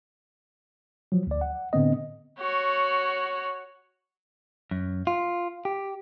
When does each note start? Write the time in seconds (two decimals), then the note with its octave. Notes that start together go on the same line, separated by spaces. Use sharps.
1.12 F3 F#3
1.27 D2 D5
1.41 F#5
1.73 A2 D3 B3 C4 D#5
2.39 F#4 C#5
4.71 F#2
5.07 F4
5.65 G4